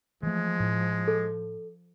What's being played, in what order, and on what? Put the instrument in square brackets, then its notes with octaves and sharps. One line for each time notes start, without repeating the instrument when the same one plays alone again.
[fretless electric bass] E3 A3 [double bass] F3 [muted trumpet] G#3
[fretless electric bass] A2
[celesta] A4